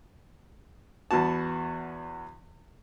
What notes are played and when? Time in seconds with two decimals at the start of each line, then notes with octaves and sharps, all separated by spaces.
1.11 E2 B3 F#4 A5